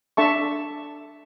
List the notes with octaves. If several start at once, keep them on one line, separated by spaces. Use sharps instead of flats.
D4 A4 E5 A5 C#6